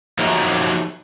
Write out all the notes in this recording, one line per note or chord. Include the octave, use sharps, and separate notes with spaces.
F3 F#3 A3 D#4 G4